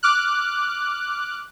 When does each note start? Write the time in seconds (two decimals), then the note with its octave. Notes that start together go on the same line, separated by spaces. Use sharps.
0.03 D6 F6 F#6